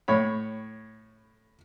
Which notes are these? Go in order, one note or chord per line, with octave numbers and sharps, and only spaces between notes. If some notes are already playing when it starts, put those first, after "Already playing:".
A2 C#5 B5